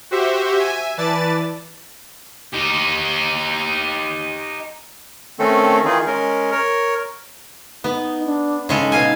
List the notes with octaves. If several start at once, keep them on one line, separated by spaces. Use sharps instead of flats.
F#4 G4 C5 E5
E5 G#5
E3 B4 D5 A5 A6
D#4 G4
D#3 A3 C4 C#4 A4
D#3 E3 D#4 F4 G#4
G#3 C#4 A#4
A#4 C#5
B3 D#4
D4
C#3 G#3 D#4 A4
B2 F5 G#5